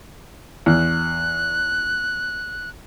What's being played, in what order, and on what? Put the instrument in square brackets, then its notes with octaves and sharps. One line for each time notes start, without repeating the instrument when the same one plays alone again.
[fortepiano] E2 [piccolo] F#6